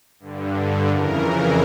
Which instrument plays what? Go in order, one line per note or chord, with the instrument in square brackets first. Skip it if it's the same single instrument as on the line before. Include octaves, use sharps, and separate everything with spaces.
[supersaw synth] G2 D3
F2 C#3 E3 A#4
A#4